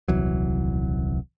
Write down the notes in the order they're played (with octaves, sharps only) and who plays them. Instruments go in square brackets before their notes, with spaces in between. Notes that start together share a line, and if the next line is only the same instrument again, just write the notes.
[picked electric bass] D#1 C2 E3 F#3